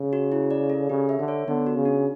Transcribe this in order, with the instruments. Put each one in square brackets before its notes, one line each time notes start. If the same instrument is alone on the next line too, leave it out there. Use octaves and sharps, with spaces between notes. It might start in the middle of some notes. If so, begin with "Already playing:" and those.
Already playing: [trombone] C#3
[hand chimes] F#4
E4
D5
A4
[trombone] C#3 [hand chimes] G4
[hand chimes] E5
[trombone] D3
[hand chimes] C#5
[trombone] D3 [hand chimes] B3
[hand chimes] F#4
[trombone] C#3
[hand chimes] D4